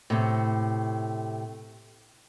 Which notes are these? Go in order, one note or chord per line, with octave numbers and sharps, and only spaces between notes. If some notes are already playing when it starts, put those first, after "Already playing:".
A2 C3